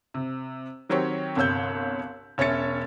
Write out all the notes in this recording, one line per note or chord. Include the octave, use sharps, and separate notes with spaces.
C3
D#3 F#3 C4 G4 C#5
G1 C2 C#5 E6 G6
E1 C#4 C#5 E5 A6 C#7